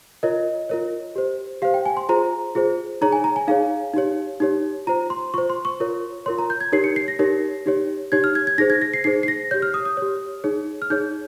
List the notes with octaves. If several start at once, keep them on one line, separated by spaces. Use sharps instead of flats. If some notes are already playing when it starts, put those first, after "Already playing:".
F4 A#4 C#5 D#5
F4 A#4 C#5
G4 C5
G4 C5 F5
G5
G#5
C6
F4 G#4 C5 A#5
F4 G#4 C5
D#4 G#4 C#5 A#5
G#5
A#5
G#5
D#4 G#4 C#5 F5
D#4 G4 C#5
D#4 G4 C#5
F4 C5 A#5
C6
F4 C5 C#6
C6
C#6
F4 A#4 C#5
F4 A#4 C#5 C6
A#5
G6
G#6
D#4 G4 A#4 C#5 C7
C#7
C7
A#6
D#4 G4 A#4 C#5
D#4 G4 C#5
D#4 G4 C#5 G#6
F6
G#6
G#6
D#4 G#4 C5 A#6
G#6
A#6
C7
D#4 G#4 C5 C7
C7
A#6
G4 C#5 G6
F6
D#6
D#6
G4 C#5
D#4 G#4 C#5
F6
D#4 G#4 C#5 G6